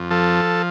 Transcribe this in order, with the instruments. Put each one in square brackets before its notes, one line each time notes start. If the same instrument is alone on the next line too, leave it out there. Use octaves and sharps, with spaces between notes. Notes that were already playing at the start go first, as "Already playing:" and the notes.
Already playing: [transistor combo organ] F2
F3 A4